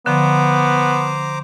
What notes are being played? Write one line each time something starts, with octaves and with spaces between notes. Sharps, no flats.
D3 F3 B3 C5 A#5 D6